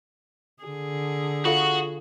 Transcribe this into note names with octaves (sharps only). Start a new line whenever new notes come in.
D3 G#4
F4 F#4 A4 F5